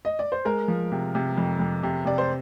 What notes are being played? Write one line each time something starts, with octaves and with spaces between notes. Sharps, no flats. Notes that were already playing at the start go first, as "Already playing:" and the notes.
D#5
D5
C5
G#3 A#4
F3
C3
C3
F2
F2
C3
C3 D5
C5